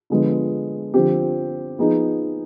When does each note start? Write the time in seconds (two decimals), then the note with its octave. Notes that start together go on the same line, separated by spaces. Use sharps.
0.10 D3 F3 G#3 B3
0.94 D3 F3 C4 G4
1.78 F3 B3 D#4 G#4